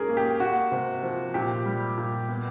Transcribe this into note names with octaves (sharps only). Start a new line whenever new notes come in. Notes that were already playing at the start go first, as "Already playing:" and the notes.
Already playing: G#2 C#4 G#4 A#4
A#3
G4
A#3 F#4
C3
F3
A#2 G4
G3
A#2
B3